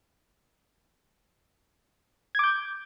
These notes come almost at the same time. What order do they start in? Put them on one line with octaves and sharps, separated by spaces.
G#6 D6 G6